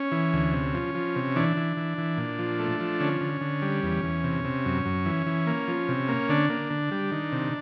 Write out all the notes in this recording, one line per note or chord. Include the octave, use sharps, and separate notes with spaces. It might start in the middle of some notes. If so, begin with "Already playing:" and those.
Already playing: C#4
E3
D2
C3
F3
F3
C3
E3 D4
E3
E3
E3
A#2
F3
A3
F3
D3 C#4
D3
D3
G3
E2
E2
C3
C3
F#2
F#2
E3
E3
A#3
F3
C3
A#3
D3 D4
A#3
D3
G3
D#3
C3